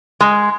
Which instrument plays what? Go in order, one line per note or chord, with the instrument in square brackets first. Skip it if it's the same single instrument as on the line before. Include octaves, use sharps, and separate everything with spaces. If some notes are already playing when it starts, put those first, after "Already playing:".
[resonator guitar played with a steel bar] G#3